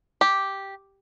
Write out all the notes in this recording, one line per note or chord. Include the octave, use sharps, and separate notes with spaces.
G4